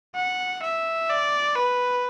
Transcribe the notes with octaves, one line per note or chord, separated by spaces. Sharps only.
F#5
E5
D5
B4